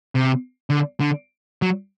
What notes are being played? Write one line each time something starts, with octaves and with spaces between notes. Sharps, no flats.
C3
D3
D3
F#3